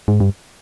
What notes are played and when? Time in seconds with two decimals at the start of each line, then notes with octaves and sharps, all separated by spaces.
0.08 G#2
0.20 G2